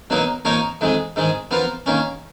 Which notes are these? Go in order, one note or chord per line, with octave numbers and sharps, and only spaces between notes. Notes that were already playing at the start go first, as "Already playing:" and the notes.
B2 F#3 A#3 D#4
F3 A#3 D#4 A#4 C#5
F2 D#3 G#3
G#2 D#3 G#3
F3 B3 F4 A#4
D#3 A#3 C#4